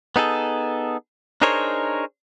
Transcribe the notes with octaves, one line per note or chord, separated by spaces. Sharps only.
B3 D#4 G#4 A4
D4 D#4 G#4 A#4 C5 C#5